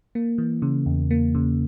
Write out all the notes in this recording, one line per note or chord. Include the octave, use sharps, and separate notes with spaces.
A#3
E3
C#3
E2
A#3
C#3